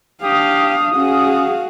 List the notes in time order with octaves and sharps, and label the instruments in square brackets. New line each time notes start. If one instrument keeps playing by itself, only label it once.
[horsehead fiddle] D4 F5 [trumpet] G4 [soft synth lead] D#6
[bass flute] C#4 [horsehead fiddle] F#4 G#4 [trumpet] F5